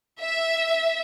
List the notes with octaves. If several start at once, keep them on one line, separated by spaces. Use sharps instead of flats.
E5